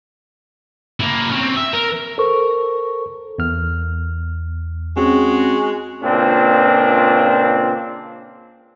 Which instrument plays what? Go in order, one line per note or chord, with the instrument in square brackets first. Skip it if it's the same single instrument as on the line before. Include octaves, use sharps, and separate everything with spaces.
[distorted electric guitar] A#3 E4
C4 C#4
E5
A#4
[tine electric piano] A4 A#4 C5 C#6
E2 F6
[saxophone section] G#3 F#4 [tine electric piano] C4 C#4 G#4
[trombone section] C#2 A#2 C4 D4